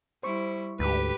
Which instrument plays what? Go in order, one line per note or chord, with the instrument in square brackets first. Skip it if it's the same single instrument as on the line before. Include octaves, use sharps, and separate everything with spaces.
[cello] G3 E4 [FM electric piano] C5 C#6
[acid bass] D2 [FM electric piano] G#2 [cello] G4 B4